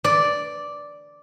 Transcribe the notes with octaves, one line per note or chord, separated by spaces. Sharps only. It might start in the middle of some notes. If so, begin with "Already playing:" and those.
D5